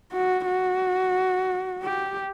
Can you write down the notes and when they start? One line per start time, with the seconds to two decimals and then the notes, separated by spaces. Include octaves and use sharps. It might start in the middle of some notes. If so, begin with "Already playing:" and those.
0.12 F#4
0.46 F#4
1.83 G4